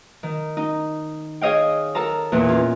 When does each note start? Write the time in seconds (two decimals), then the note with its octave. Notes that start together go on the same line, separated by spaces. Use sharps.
0.23 D#3
0.57 D#4
1.41 G#4 C#5 D#5 F5 G5
1.95 A4 A#4 A5 A#5
2.32 E2 A#2 B3
2.49 C#4 F4